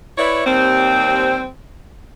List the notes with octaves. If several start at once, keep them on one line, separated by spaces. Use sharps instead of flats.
E4 B4 C#5 D5 E5
D#2 G3 C4